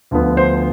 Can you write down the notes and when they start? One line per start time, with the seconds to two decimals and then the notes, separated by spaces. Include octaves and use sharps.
0.11 D2 D3 F3 B3
0.37 C5